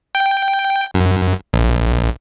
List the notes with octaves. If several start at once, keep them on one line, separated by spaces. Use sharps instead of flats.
G5
F#2
A#1